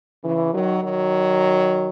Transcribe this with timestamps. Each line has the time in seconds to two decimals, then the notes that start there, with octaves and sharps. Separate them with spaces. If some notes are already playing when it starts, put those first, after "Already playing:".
0.23 C#3 E3
0.53 D#3 F#3
0.83 D#3 F#3